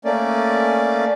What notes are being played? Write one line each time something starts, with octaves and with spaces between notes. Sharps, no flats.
A3 A#3 C#4 D5